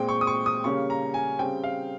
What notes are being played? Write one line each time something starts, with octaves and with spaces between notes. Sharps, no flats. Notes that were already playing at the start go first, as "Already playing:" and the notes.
Already playing: A#2 G#3 C4 G5
C#6
D#6
C#6
D#6
C#3 G3 A#3 C#4 C#6
A#5
G#5
C#3 G3 C4 G5
F5